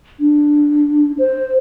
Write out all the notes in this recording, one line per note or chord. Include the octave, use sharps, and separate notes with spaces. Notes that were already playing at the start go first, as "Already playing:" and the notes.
D4
C5